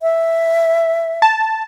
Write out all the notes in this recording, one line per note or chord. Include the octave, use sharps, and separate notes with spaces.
E5
A5